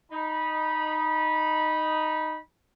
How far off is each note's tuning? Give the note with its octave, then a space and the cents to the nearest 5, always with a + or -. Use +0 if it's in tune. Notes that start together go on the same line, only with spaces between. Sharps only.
D#4 -5 B5 -20